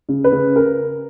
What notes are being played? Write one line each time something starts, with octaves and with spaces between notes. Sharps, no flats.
C#3
B4
C#3
A#4